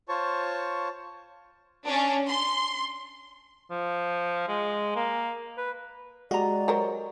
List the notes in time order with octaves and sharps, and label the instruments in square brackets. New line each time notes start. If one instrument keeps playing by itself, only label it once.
[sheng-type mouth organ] F4 C5 C#5 A5 C#6
[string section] C#4 D4
C6
[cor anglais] F3
G#3
A#3
B4
[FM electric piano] G#3 F#4 G4 [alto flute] D5 [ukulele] D#5 A#5
[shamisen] F#3 A#4 C5